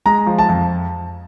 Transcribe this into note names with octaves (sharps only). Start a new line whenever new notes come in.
G#3 A#5
F3
A5
F2